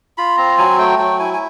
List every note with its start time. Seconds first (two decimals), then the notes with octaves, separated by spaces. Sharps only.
0.18 F4 B5
0.37 C4 A#5
0.58 F#3 G#5
0.78 A3 G5
0.99 F#3 G5
1.19 E4 G#5
1.33 G#5